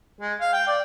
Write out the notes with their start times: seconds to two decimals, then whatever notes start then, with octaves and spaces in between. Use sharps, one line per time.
0.21 G#3
0.40 F5
0.53 G5
0.67 D5